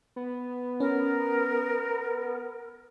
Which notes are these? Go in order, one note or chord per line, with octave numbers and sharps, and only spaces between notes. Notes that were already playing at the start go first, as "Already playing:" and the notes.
B3
C#4 A#4